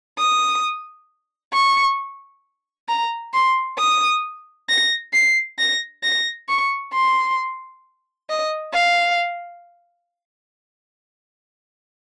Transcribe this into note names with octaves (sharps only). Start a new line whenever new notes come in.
D#6
C#6
A#5
C6
D#6
A#6
C7
A#6
A#6
C#6
C6
D#5
F5